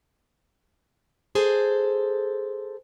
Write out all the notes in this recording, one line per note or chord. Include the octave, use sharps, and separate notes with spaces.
G#4 A4 C5